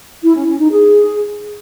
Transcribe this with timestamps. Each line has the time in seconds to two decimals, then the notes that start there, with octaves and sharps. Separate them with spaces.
0.23 E4
0.35 C#4
0.47 C#4
0.59 D#4
0.71 G#4